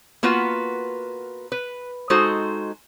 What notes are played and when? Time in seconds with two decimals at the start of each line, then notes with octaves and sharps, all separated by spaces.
0.23 A#3 B3 F4 F#4 B4
1.52 B4
2.10 G#3 D#4 F#4 A4 C5